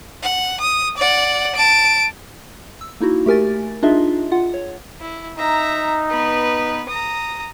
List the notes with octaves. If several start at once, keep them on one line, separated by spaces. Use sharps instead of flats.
F#5
D#6
D5 F#5
A5 D7
E6
A#3 D#4 E4 F#4
A3 G4 A#4 G#5 A6
D4 D#4 F4 G#4 D#5 E5
F4 F#5
C#5
E4
D#4 E5 A#5
B3 B4
A#5 D#6